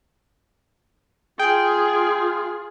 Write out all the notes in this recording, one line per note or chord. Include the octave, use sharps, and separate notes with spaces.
F4 G#4 G5